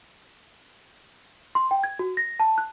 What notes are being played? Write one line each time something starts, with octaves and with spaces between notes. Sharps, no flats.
C6
G5
G#6
F#4
A#6
A5
F#6